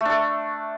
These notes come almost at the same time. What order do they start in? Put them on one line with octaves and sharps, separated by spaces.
A3 D4 A4